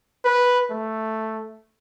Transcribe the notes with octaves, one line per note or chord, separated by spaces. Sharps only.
B4
A3